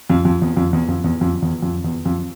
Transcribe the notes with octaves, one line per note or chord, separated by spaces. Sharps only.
F2
F2
E2
F2
E2
F2
E2
F2
E2
F2
E2
F2